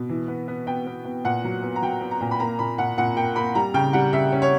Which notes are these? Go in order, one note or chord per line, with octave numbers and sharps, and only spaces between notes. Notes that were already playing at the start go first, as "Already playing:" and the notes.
Already playing: B2
E3
B3
B3
B3 G5
B3
B3
A#2 F#5
F#3
B3
A#5
F#3 G5
B3
A#5
A#2
B5
A#3 A#5
A#2 B5
A#2 F#5
A#2 F#5
A#3 G5
A#3 B5
G3 A#5
C#3 G5
G3 F#5
C#3 E5
C#4
C#5